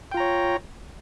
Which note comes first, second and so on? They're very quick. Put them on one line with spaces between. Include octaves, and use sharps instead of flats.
G5 F4 A#5 C#5